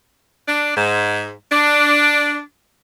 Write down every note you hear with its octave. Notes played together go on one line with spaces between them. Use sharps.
D4
G#2
D4